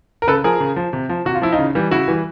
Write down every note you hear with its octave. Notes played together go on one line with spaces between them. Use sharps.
A#4
C#3 A4 B4
F3 G#4 A#4
C#3
F3
C3
F3
C3 F#4
F4
F3 E4
D#4 F4
C#3
E3 G3
C#3 E4 F#4
E3 G3